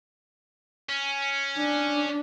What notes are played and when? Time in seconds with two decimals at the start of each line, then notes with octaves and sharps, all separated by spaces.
0.89 C#4
1.57 D4